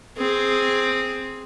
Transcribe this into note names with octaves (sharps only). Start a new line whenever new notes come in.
C4 G#4